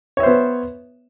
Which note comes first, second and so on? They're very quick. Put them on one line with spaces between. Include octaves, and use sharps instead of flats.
C#5 E5 C5 B3